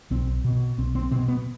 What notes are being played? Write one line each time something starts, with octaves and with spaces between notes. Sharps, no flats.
B1 C4
B2
B1 C4
C4
B2 C4
B3